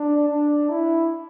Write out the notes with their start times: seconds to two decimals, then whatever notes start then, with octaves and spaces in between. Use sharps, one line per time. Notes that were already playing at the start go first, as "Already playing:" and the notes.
Already playing: D4
0.30 D4
0.70 E4